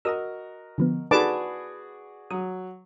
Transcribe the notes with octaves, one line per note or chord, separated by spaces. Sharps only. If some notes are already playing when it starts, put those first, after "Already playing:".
F#4 A#4 D#5 A#5 D#6 E6
D3 F3 B3
D#4 F#4 G#4 A4 B4 D5 A5 D6
F#3 D#6